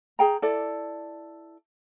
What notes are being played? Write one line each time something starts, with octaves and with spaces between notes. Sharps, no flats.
G#4 G5 A#5
E4 A4 D5